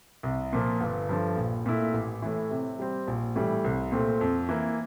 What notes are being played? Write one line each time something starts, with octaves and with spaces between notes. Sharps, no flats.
C2
A#2 F3 A#3
G1
G2 D3 F3
A#1
A#2 A3 E4
A1
A2 E3
C3
G3 C4
A#1
A2 E3 G3
C2
A#2 A3 C4
F2
E3 A#3